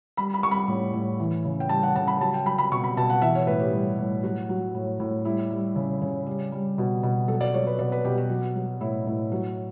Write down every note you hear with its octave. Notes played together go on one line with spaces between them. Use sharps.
G3 B5
B5
G3 C#6
B5
A2
A2
E3
C#3
G5
G3 A5
F#5
C#3 A5
B5
F#3 A5
G5
F#3 B5
B5
B2 C#6
B5
B2 A5
F#5
E3 E5
C#5
A2 B4
G4
G3
A2
F#3 F#4
F#3
A2
A2
G3 E4
G3
C#3
C#3
G3
G3
B2
B2
F#3 A4
D5
F#3 C#5
B4
B2 D5
B4
B2 G4
F#4
F#3
F#3
A2 E4
A2
F#3